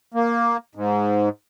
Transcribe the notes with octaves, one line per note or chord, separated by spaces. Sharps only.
A#3
G#2